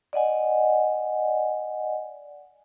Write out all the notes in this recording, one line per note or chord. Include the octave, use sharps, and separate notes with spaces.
D5 D#5 F#5 G#5